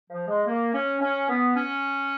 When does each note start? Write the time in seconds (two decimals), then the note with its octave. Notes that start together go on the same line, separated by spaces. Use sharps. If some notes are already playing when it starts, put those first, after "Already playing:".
0.10 F3
0.28 G#3
0.47 A#3
0.73 C#4
1.01 C#4
1.29 B3
1.56 C#4